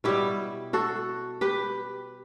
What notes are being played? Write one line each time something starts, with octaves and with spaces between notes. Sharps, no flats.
B2 G3 E4 G4
F#4 A4
G4 B4